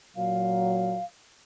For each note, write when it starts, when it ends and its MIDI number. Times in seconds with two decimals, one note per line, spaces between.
0.16 0.98 46
0.16 0.98 54
0.16 1.04 77